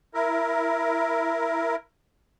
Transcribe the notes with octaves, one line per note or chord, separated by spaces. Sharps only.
E4 A#4